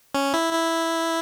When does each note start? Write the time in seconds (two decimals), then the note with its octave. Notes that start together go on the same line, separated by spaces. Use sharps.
0.15 C#4
0.34 E4
0.53 E4